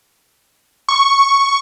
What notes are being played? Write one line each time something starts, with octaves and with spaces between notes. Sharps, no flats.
C#6